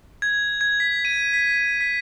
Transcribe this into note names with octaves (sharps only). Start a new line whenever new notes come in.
G#6
G#6
B6
D#7
B6
B6